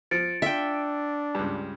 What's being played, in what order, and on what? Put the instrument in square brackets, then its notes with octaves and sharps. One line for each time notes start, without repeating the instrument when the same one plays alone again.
[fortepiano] F3 [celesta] A6 C#7 D7
[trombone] D4 [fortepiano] F4 [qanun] E5 G5
[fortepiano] C#2 G2